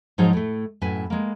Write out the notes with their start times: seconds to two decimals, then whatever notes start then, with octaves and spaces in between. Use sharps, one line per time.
0.18 G#2 F3 F#3 D#4 G#4 C#5
0.33 A2 A3
0.81 F#2 A2 B4 G#5
1.10 G#3 A#3